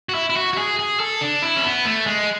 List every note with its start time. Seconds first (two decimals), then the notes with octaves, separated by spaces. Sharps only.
0.09 F#4
0.15 E4
0.30 E4
0.36 F#4
0.53 F#4
0.58 G#4
0.79 G#4
1.00 A4
1.21 D4
1.42 E4
1.56 C#4
1.63 B3
1.85 A3
2.07 G#3